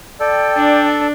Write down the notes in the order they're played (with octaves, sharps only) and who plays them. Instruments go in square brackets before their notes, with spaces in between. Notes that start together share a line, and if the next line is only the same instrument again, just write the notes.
[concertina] A4 [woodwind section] D5 G5
[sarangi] D4